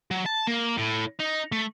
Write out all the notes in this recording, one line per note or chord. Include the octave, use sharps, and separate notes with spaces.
F#3
A5
A#3
A2
D#4
A3